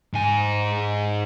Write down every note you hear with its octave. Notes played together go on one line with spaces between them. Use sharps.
G#2 G#5